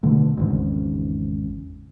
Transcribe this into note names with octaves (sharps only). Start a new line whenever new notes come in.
B2 D3 A3
G#1 E2 G#2 C#3